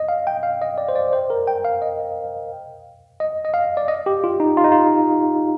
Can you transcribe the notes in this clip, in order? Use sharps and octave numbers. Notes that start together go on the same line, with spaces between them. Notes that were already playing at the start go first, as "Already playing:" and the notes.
Already playing: D#5
F5
G5
F5
D#5
D5
C5
D5
C5
A#4
G5
F5
D#5
D#5
D#5
F5
D5
D#5
G4
F4
D#4
F4
D#4
F4